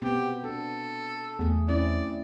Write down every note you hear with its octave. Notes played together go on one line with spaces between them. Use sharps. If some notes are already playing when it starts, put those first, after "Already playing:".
B2 B3 C4 G4
D4 A4
E2 A3 G#4
C4 C#4 E4 D5